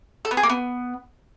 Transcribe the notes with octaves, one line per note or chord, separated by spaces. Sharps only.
A4
B3
G#4
A#3
B3